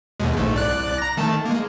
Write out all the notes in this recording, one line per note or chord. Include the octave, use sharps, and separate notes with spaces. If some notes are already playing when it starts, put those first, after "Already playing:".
D#2 B2 G#3
A#1 G#2 A3
C2 D5 F#6
A#5 A#6
D#3 A3 A5
G#3 A#3